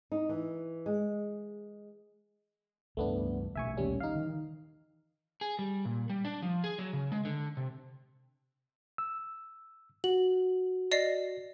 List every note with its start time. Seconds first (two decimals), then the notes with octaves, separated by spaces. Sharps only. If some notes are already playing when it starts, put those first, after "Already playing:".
0.12 D#4
0.29 E3
0.86 G#3
2.97 C#2 G2 A3 B3 D4
3.56 A#1 B2 A3 E5 G#5 C#6
3.77 D#2 G3 C#4
4.00 D#4 F5
4.15 D#3 E3
5.41 G#4
5.59 G3
5.85 A#2
6.10 G3
6.25 D4
6.42 F3
6.64 G#4
6.78 F#3
6.93 C#3
7.12 G#3
7.25 D3
7.57 C3
8.98 E6
10.04 F#4 F#7
10.92 D5 D#5 C7